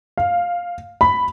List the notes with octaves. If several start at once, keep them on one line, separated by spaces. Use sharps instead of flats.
F5
B5